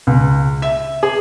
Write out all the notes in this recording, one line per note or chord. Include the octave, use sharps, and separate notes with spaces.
C#2
E5
G#4